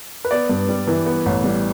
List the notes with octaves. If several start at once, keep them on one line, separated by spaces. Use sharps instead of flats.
B4
B3 D5
G2
G3
E3
B3
A1
G3